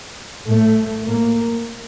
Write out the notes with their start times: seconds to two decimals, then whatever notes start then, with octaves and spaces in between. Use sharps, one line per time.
0.47 A2 A3
1.05 A2 A#3